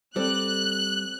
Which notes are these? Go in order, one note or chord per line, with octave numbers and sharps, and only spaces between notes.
G3 C4 A4 D5 F#6